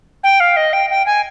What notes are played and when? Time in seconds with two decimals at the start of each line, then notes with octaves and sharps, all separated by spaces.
0.24 G5
0.40 F5
0.57 D#5
0.73 G5
0.90 G5
1.06 G#5